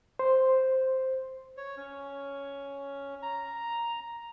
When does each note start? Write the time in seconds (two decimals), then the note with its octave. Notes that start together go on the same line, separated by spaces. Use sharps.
0.19 C5
1.57 C#5
1.77 C#4
3.22 A#5